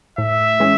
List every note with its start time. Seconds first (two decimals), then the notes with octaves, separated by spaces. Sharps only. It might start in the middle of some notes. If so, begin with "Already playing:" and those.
0.18 A2 E5
0.60 E3 G#3 C#4